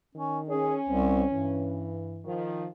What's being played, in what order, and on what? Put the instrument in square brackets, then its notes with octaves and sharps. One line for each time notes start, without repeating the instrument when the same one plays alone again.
[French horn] D#3 [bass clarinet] C#4
[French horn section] C#4 [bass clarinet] G#4
[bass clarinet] C2 [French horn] C4
[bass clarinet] G2 [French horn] E3
[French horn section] D#3 F3